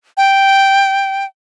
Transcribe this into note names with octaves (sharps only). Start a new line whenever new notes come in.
G5